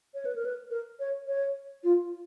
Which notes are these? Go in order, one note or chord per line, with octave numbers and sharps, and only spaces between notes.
C#5
B4
A#4
B4
A#4
C#5
C#5
F4